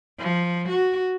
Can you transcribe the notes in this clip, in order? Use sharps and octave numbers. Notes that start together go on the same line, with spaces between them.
F3
F#4